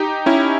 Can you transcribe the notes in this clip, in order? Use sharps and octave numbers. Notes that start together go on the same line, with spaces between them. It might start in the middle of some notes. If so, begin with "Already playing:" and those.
Already playing: D#4 G4
C#4 E4